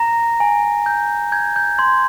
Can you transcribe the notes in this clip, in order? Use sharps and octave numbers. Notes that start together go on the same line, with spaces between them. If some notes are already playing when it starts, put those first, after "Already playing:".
Already playing: A#5 A#6
G#5
G6
G6 G#6
G6
C6 G#6